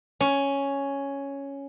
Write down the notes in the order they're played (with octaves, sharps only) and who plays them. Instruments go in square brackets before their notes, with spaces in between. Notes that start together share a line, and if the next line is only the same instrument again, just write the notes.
[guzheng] C#4